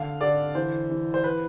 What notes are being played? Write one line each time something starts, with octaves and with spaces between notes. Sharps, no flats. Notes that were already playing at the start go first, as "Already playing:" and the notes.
Already playing: D3 F5
D3 D5
E3 C5
E3
C5
B4